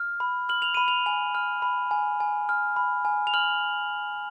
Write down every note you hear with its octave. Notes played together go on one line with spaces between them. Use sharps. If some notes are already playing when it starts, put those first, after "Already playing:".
Already playing: F6
B5
F6 F#7
F7
B5 D#7
F7
G#5 F7
F6
B5
G#5
G#5
F6
B5
G#5
F7
F6 F#7